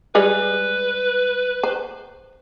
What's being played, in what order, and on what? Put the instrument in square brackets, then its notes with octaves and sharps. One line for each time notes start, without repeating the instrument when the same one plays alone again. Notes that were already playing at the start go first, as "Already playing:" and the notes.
[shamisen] G3 G#3 G#4 [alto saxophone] B4
[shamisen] C5